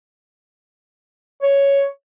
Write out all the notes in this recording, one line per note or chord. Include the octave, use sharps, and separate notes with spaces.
C#5